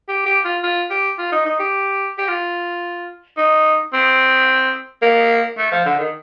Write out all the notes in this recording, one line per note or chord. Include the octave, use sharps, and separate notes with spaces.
G4
G4
F4
F4
G4
F4
D#4
D#4
G4
G4
F4
D#4
C4
A#3
A3
F3
D3
D#3